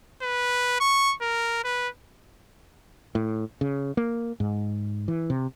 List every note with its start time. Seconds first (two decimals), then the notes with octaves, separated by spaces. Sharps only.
0.22 B4
0.80 C#6
1.22 A#4
1.64 B4
3.15 A2
3.61 C#3
3.97 A#3
4.40 G#2
5.08 E3
5.30 C3